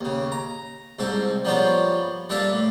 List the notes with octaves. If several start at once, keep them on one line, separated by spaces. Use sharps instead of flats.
D#2 C#3
A#5
C2 G#2 C4 A4
F3 G3 A#3 B3 C#4 F4
G3 A#3 D4 A4 E5 F5
A2